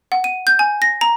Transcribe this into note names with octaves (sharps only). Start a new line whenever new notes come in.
F#5
D#7
G6
G#5
A#6
A#5